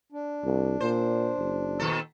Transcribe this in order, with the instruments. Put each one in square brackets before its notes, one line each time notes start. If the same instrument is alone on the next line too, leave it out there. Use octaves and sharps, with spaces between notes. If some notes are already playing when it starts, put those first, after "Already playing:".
[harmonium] D4
[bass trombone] C2
[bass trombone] A#2 [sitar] C5
[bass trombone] F#1
[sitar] A#2 D#3 A4